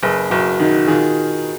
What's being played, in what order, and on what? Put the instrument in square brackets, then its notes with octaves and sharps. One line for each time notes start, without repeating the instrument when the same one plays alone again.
[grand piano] F#1 [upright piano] G#4 B4
[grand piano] F#1 [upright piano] F#4 A#4
[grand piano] D#3 [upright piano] D#4 F#4
[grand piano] D#3 [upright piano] F4 G#4